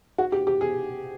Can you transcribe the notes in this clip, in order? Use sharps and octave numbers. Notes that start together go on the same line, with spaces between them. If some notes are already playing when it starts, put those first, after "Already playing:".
F#4
G4
G4
G#4